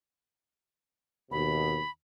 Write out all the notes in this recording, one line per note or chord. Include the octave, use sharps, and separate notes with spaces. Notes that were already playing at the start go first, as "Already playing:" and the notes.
D#2 B2 B5